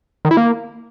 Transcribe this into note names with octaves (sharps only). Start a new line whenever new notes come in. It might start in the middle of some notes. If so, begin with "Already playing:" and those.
D#3
E4
A#3